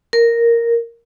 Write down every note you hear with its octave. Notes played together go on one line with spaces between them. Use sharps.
A#4